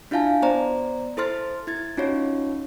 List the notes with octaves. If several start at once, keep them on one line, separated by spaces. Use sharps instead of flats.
D4 E4 F4 F5 G#5 A5
B3 C5 D5 A#5
E4 A4 C5 C6 F6 A6
E4 G#6 A6
C#4 D#4 F4 F#4 C#5